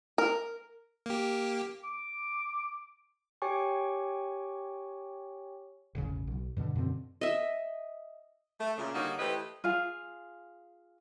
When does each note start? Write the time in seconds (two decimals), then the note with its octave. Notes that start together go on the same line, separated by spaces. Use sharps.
0.18 A#4
1.06 A#3 G4
1.84 D6
3.42 G4 C#5 G5 G#5 C#6
5.95 E1 A1 C#3
6.27 B1
6.57 G2 B2 D3
6.76 F#2 B2 D3 C4
7.21 D#5 E5
8.60 A3
8.77 A#2 C#3
8.95 D3 G3 A#3 D#4 F#4 C#5
9.19 E3 A3 G4 B4 C5 D#5
9.64 F4 G#4 F5